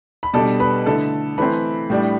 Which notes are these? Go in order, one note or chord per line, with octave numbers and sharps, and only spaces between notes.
B5
B2 G3 D4 A4 A5
B4 B5
D3 A3 E4 A4 A5
E3 A3 C4 B4 B5
A2 G3 D4